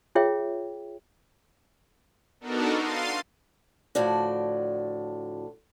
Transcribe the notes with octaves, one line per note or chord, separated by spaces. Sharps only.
F4 G#4 C#5 E5 G5
B3 D4 D#4 F#4 A4 A#4
F5 C6 A6 C7 D#7
A2 D3 F3 F#4 D5